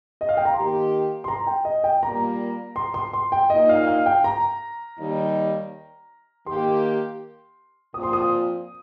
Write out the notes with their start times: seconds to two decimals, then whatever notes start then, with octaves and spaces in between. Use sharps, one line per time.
0.21 D#5
0.29 F5
0.37 G5
0.45 A#5
0.54 D#3 A#3 G4 C6
1.24 C6
1.28 A#5
1.47 G5
1.65 D#5
1.84 G5
2.02 A#2 G3 A#3 A#5
2.76 C6
2.94 C6
3.13 C6
3.32 G5
3.50 A#2 A#3 D#4 D#5
3.69 F5
3.87 F5
4.06 G5
4.24 A#5
4.98 D#2 D#3 G3 D#4
6.46 D#3 A#3 G4 C6
7.94 A#2 F3 C4 F4 D#6
8.03 C6
8.13 D#6